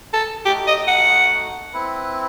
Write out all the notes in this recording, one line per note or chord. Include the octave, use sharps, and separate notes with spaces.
A4
A3 D#4 F#4 G4
D#5
F#5
C4 E4 B4